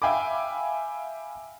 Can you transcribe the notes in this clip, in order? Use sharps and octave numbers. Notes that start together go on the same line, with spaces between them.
E5 F5 G5 G#5 B5 D6